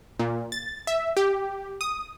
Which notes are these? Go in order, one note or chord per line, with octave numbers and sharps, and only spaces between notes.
A#2
A6
E5
G4
D#6